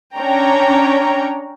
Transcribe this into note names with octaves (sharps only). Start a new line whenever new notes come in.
C#4 D4 C#5 G5 A#5